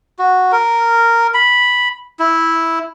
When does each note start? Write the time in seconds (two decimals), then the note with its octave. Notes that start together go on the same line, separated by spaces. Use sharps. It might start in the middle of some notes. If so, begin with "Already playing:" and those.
0.19 F#4
0.52 A#4
1.34 B5
2.20 E4